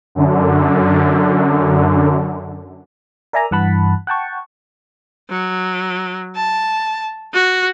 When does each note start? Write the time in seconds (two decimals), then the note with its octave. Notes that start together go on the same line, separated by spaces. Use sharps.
0.15 F#2 D3
3.33 A#4 D5 E5 G#5 A#5
3.51 G2 E3 F#5 A5 B5
4.07 F#5 G5 A5 C#6
5.30 F#3
6.35 A5
7.33 F#4